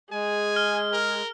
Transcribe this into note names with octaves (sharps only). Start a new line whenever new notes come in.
G#3 G#4 G#5
F6
A#4